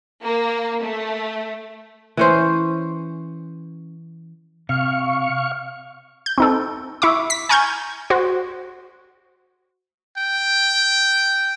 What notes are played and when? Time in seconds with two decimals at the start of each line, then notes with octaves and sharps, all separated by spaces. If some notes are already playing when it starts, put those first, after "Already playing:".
0.22 A#3
0.82 A3
2.17 E3 C#4 C5
4.69 C3 F5 C#6
6.26 G6
6.38 C4 D#4 A4
7.02 E4 E5 C#6 D6
7.30 B6
7.49 G#5 A#5 C#6 F6 G6 G#6
8.10 F#4 C5
10.17 G5